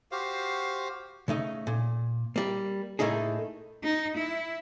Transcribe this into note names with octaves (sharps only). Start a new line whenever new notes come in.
F#4 G4 C5 F5
C#3 A3 D#4 D#5
A#2
G3 A#3
A2 A3 A#3 D#4 G#4
D#4
E4